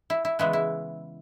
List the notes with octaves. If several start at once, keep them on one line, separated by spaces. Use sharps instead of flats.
E4
E4
C#3 E3 G#3 B3 E4
E4